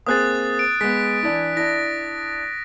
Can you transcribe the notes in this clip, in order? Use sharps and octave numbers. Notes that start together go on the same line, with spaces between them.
A#3 C4 G#4 D#6 F#6 A6
D7
G#3 B3 B6
E3 D4 E4
D4 E4 A#6